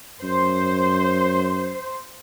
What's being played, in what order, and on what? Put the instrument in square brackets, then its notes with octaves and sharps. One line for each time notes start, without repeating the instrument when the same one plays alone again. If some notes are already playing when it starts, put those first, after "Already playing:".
[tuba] F#2 [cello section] C5